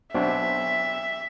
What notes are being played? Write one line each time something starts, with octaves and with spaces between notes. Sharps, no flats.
B1 C4 D4 E5